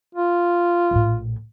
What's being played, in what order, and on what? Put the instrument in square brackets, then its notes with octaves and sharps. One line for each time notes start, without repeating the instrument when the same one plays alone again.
[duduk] F4
[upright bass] A#1 A2